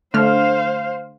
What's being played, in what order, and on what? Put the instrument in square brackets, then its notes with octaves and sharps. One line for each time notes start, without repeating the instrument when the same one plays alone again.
[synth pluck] D3 A3 F6 [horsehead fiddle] C5 F5